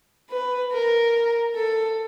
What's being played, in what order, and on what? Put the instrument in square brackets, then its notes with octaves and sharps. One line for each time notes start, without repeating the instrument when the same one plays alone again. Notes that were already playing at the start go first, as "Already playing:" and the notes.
[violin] B4
A#4
A4